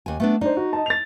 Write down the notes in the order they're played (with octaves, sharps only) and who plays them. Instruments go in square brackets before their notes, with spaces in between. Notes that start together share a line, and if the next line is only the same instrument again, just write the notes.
[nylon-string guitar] D#2 G#5
A3 B3 D4
[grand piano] D4 C5 [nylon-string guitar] D#4
[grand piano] F#4
D#5 A5
A6 F7